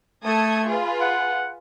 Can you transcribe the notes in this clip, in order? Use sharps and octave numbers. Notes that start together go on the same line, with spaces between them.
A3 A4 D#6 G#6
F4 G#4 B4
F#5